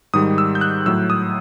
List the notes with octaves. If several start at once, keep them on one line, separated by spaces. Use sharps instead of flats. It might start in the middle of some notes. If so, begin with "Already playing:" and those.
G#2 D#3 G3 D#6
E6
G6
F#6
A2 F#3 E6
D#6